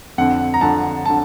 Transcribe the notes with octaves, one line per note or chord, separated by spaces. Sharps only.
F2 D3 F#5
A#5
F2 D3 A5
D3 A5